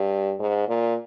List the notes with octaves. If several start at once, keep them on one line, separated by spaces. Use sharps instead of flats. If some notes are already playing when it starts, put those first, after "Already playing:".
Already playing: G2
G#2
A#2